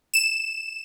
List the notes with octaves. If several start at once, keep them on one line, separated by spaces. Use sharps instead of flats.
E7